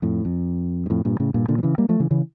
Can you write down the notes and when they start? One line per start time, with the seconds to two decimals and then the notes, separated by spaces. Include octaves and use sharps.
0.02 F2 A2
0.25 F2
0.86 G2
0.90 F2 A2
1.05 G2 A#2
1.20 A2 C#3
1.34 G2 A#2
1.48 A#2 D3
1.58 F3
1.63 C#3 E3
1.78 G3 A#3
1.89 F3 A3
2.00 C#3 E3
2.11 C#3 E3